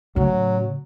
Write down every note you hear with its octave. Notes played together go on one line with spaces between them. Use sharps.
A2 C#3 F#3